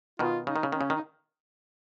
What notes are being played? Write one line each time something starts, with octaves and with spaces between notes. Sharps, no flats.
B2 D#3 F4
C#3 D#4
D#3
C#3
D#3 C#4
C#3
D#3
D#4